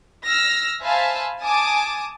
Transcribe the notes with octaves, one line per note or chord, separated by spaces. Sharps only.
E6 F6 A#6
C5 E5 F5 G#5 A5 B5
G#5 A5 D6 D#6